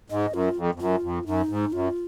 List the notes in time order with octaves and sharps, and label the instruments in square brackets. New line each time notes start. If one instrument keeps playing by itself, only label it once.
[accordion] G#2 [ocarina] D#5
[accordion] F#2 [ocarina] F4
[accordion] F2
F2
[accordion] F#2 [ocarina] F4
[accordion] F2
[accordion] F#2 [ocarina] D#4
[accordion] G#2
[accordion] F#2 [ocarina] F4